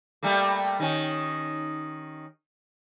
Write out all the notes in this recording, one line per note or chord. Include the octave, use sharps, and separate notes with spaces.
G3 A3 A#3
D#3 C#4